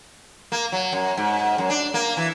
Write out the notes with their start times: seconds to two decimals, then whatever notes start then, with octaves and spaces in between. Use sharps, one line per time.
0.52 A#3
0.72 F#3
0.93 F#2
1.17 G#2
1.58 F#2
1.70 D4
1.94 A#3
2.17 E3